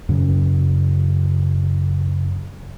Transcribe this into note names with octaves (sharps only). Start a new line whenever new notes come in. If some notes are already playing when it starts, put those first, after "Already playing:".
F#2 C#3